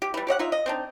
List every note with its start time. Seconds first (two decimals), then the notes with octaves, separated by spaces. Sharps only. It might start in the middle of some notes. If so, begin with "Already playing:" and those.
0.02 G4
0.14 E3 G3
0.27 G4 C#5 D#5 F#5
0.39 D#4 F4 E5
0.52 D#5
0.66 C4 D4 D#4